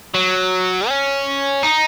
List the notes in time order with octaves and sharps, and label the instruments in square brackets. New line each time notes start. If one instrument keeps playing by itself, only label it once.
[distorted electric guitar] F#3
C#4
D#4